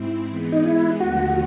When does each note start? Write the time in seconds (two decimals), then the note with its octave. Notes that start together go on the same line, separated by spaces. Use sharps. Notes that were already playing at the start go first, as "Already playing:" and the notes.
Already playing: G#2 C4 E4
0.28 E3 G#3 B3
0.52 D#4
0.65 E4
1.00 D#2 D3 F3 A3 F#4